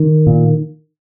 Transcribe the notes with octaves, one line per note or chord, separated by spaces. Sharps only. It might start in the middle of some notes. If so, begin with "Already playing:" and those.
Already playing: D#3
A#2